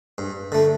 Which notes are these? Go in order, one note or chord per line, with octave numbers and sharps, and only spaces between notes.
G2
D3 A3